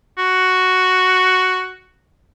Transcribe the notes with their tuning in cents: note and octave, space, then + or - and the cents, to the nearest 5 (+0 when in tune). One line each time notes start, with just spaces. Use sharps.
F#4 +0